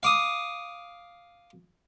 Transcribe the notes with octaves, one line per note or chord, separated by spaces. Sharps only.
F5 D6 D#6